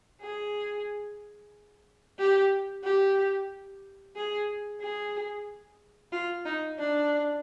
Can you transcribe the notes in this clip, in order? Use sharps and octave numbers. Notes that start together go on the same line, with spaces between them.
G#4
G4
G4
G#4
G#4
F4
D#4
D4